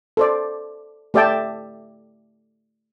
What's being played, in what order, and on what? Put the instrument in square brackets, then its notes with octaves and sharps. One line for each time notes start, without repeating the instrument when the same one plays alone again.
[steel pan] A4 C5 D5
A3 G4 D5 E5 G5 A5